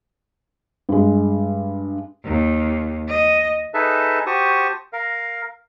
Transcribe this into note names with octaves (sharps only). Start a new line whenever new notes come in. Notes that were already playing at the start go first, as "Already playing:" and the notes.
G2 G#3
D#2
D#5
D#4 G#4 A4 B4 E5 A5
F#4 G4 C5 A5 C#6 D#6
A#4 F5